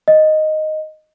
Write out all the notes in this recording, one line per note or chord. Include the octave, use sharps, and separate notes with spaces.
D#5